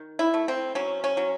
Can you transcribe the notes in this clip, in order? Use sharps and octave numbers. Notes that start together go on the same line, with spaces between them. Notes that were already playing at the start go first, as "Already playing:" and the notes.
Already playing: D#3
E4
A3
C4
F#3 C#4
C#4
F#3